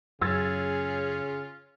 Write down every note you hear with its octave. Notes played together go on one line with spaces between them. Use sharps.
F#2 C#3 C#4 F4 G#4 E6 G#6 A6